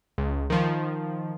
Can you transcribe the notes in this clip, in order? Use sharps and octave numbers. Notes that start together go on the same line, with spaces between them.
C#2
D#3 F3